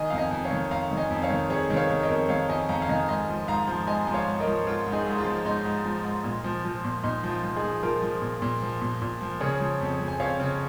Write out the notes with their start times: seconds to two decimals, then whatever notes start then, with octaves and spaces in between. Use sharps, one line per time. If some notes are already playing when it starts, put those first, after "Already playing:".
Already playing: D#3 D#5 G#5
0.10 F2 F5
0.18 D#5 G#5
0.31 F2
0.45 C#5 F5
0.51 D#3
0.71 F2 F5 A#5
0.91 D#3
0.97 D#5 G#5
1.10 F2
1.23 C#5 F5
1.30 D#3
1.50 F2 G#4 C#5
1.70 D#3
1.76 C#5 F5
1.90 D#3
2.03 A#4 D#5
2.09 F2
2.29 D#3 C#5 F5
2.48 F2 D#5 G#5
2.69 F2 F5 A#5
2.82 F5
2.89 D#3 D#5 G#5
3.08 G#2 D#5 G#5
3.28 F3
3.47 G#2 F5 A#5
3.67 F3
3.87 G#2 D#5 G#5
4.07 F3
4.14 C#5 F5
4.27 G#2
4.40 A#4 D#5
4.47 F3
4.66 G#2 F4 A#4
4.86 G#2
4.92 D#4 G#4
5.06 G#2
5.12 G#4
5.19 F4
5.25 F3
5.45 G#2 D#4
5.65 G#2
5.84 F3
6.04 G#2
6.24 A#2
6.44 F3
6.65 F3
6.84 A#2
7.03 A#2 D#4
7.24 F3
7.30 F4
7.43 F3
7.56 D#4 G#4
7.62 F3
7.83 F3 F4 A#4
8.02 F3
8.22 A#2
8.42 A#2
8.62 F3
8.81 A#2
9.02 A#2
9.21 F3
9.40 C#3 G#4 C#5
9.61 F3
9.81 F2
10.01 F2
10.08 G#5
10.20 F2 C#5 F5
10.40 C#3